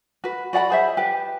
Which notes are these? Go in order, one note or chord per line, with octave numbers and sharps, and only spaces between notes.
F#4 B4
F#4 D5 F#5 B5
G#4 C5 E5
G4 B4